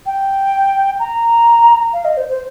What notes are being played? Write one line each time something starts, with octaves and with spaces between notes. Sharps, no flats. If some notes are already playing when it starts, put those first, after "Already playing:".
G5
A#5
F5
D#5
C5
C5